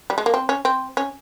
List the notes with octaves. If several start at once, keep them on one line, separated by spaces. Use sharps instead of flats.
G3
G#3
A#3
C4
C#4
C4
C#4